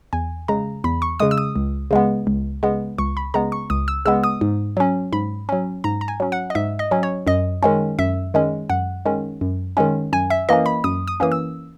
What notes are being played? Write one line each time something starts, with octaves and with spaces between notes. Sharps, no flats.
E2 G#5
C#3 G#3 A#5
E2 B5
C#6
C#3 G#3 D#6
E6
D#6
C#2
C#3 G#3 B3
C#2
C#3 G#3 B3
C#2 C#6
B5
C#3 G#3 B3 A#5
C#6
C#2 D#6
E6
C#3 G#3 B3 E6
D#6
G#2
F#3 C#4
G#2 B5
F#3 C#4
G#2 A#5
A#5
G#5
F#3 C#4
F#5
D#5
G#2 E5
D#5
F#3 C#4
C#5
F#2 D#5
D#3 G#3 C#4
F#2 E5
D#3 G#3 C#4
F#2 F#5
D#3 G#3 C#4
F#2
D#3 G#3 C#4
F#2 G#5
E5
E3 A#3 C#4 D#5
B5
F#2 D#6
D#6
E3 A#3 C#4 D#6
E6